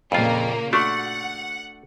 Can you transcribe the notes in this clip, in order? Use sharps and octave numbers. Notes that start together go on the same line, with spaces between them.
F2 A#2 C#3 A#3 F4
A3 D4 F#4 F#5 C#6